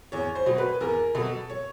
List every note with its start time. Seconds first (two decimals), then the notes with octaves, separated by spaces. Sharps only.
0.12 E2 C#5
0.35 C5
0.46 B2 F#3
0.58 B4
0.81 E2 A#4
1.15 B2 F#3 A4
1.50 C#5